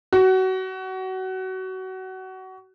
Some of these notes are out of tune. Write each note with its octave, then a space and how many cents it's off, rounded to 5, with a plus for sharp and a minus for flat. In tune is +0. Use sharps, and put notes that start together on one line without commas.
F#4 +25